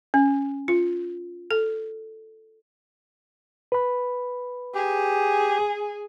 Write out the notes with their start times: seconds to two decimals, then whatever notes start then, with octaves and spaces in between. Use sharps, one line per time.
0.14 C#4
0.68 F4
1.51 A4
3.72 B4 B5
4.74 G4 G#4